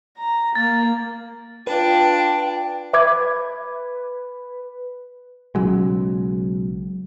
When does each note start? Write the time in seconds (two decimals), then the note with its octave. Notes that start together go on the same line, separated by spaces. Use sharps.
0.18 A#5
0.55 A#3 A6
1.67 D4 F4 B4 G5
2.93 B4 E5 D6 G#6
5.55 B1 C#3 F#3 G#3